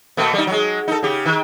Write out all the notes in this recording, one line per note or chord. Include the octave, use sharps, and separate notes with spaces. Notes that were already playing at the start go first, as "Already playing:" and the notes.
B2 A3 A#3
G3 D#4
F#3 G#3
D#4 A4
C#3 G4
D#3